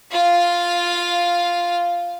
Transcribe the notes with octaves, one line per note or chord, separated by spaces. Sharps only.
F4 F5